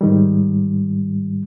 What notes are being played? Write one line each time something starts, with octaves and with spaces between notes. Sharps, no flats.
G#2 D#3 G3